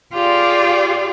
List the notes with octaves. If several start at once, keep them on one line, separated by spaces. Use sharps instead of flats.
F4 G4 G#4 D5